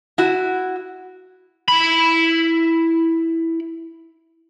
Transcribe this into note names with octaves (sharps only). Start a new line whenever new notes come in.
E4 F#4
E4 B5